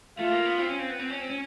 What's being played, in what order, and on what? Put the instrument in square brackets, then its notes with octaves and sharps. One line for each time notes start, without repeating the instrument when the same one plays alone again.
[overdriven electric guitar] A3 [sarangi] F4
[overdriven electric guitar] A#3
B3
C4
C#4
C4
B3
C4
C#4
C4
C#4